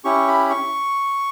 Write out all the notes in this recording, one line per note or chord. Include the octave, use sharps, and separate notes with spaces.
C#4 E4 G4 C#6
B5
C#6